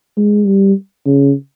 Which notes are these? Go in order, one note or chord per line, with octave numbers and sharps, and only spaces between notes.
G#3
G3
C#3